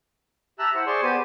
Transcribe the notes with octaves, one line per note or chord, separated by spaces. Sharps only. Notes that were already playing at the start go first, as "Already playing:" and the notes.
G4 E5 A5 A#5 E6 F#6
E4 C5 F#5
G#4 C5 D5 C6 C#6
B3 G4 C5 D5 G#5